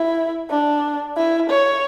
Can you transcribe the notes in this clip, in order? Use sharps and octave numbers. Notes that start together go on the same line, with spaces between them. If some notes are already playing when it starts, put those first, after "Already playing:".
Already playing: E4
D4
E4
C#5